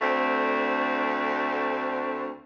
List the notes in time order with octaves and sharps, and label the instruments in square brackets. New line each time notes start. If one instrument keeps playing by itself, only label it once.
[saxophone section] D2 D3 A3 C4